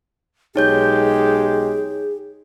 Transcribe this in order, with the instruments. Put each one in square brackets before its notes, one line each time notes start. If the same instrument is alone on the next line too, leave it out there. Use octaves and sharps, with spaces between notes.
[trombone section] B1 G#3 G4 [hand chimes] D#4 C#5 G6 [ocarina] G#4